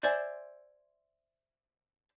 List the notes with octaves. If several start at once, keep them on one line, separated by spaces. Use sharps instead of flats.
C5 D5 E5 G#5